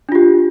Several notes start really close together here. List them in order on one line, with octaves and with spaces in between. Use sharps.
D4 F4 G4